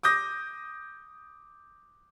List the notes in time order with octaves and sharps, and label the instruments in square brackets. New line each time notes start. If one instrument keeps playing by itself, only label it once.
[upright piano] D6 D#6 G6 A#6